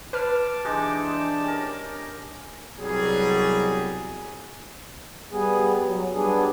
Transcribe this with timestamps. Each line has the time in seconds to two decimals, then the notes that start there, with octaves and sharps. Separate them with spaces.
0.13 B4 A5 D6 F6
0.64 E3 G#3 D4 D#4 G4
1.44 C#4 A#4
2.79 C2 B2 F#3 G3 G#4
5.32 G3 B3 G#4
5.84 F#3
6.14 G3 B3 D4 G#4